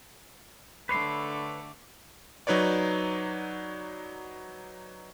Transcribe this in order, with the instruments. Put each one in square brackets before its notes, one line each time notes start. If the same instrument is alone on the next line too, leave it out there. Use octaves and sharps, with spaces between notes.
[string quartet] D3 A3 D6 [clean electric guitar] B4 C#5 C6 [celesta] B5
[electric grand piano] F#3 D#4 B4 C#5 D5